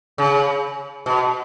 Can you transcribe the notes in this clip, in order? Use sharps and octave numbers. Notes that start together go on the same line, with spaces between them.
C#3
B2